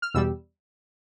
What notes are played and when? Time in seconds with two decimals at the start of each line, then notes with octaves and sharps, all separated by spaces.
0.02 F6
0.14 E2 B2 G3 E6